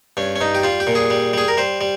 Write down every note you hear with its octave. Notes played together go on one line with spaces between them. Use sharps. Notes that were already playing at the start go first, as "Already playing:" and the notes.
G2 C#4
C#4
G2 D#4
G4
G3 F4
G4
A#2
G#4
G3
G3 G#4
A#4
G3 C5
G3